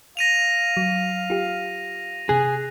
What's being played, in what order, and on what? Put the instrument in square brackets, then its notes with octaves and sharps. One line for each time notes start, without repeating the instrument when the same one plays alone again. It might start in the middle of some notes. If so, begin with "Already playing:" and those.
[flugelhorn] F5 [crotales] A#6 D#7 F7
[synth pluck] F#3
F4 G4
[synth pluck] C3 F#6 [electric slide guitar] G#4